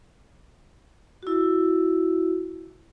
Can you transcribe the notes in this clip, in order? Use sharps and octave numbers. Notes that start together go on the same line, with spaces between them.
E4 F#4